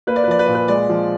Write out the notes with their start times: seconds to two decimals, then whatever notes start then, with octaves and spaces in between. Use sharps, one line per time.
0.07 A#3 B4
0.16 D5
0.24 B4
0.28 F3 D5
0.39 B4
0.46 A#2 D5
0.55 B4
0.68 G#3 D5
0.89 F3